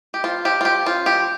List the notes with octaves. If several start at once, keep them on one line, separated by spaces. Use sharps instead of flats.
G4
F3 F4
F3 G4
F4
F3 G4
C#4 F4
F3 G4